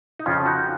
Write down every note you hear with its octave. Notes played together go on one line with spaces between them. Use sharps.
D#4
F2 C#3 F3 C#4 F4
D#4 F#4